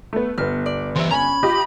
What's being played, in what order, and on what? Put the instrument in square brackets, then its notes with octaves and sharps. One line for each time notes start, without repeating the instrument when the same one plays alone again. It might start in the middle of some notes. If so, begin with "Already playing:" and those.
[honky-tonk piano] A3 B3
[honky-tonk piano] G1 B3 [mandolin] F6
[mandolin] D5
[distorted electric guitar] E3 G4 [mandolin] C5 E5
[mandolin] C#4 G#5 [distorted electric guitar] A#5 B5
[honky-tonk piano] F4 G4 D#5